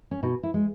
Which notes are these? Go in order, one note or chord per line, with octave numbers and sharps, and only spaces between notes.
C#4
B2 D#4
E4
G#3